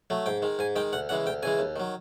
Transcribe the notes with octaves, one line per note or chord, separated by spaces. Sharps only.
F#3 A3
G#2 G5
D#3 G#3
G#2 G#5
D#3 G#3 G5
D2 F#5
C#3 E3 G#3 F#5
D2 G5
C#3 E3 G#3 G#5
D#2
D#3 F#3